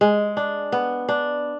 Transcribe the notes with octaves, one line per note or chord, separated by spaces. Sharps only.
G#3
D4
B3
D4